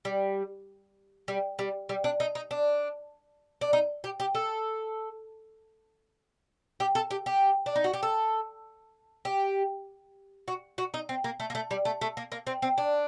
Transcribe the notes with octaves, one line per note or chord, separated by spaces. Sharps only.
G3
G3
G3
G3
D4
D#4
D#4
D4
D4
D#4
G4
G4
A4
G4
A4
G4
G4
D4
D#4
F#4
G4
A4
G4
F#4
F#4
D#4
C4
A#3
A3
A#3
A3
G3
A3
A3
A#3
A#3
C4
C4
D4